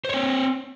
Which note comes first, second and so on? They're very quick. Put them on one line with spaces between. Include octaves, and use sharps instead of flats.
C5 C#5 C4